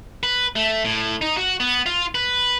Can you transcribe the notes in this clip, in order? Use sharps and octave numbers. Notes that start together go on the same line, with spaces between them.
B4
A3
A2
D#4
F#4
B3
F4
B4